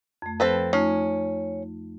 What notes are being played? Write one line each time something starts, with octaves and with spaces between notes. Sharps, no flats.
F2 A3
F3 C4 A4 B4
A3 C#4 D#4 F4